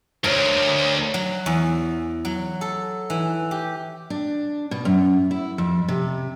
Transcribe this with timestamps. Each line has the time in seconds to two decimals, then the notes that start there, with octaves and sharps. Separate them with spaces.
0.24 D2 A#4 C5 C#5
1.14 F#3
1.46 E2
2.25 F#3
2.61 A4
3.10 E3
3.51 G4
4.10 D4
4.71 B2
4.85 F#2
5.31 E4
5.58 F2
5.88 C3